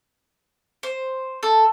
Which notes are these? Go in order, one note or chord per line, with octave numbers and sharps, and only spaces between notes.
C5
A4